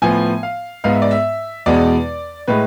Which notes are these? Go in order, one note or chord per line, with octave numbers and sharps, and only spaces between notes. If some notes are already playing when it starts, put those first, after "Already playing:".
A2 F3 B3 G#5
F5
G#2 G#3 B3 F5
E5
D5
E5
E2 B2 G#3 B3 D5
A2 G#3 B4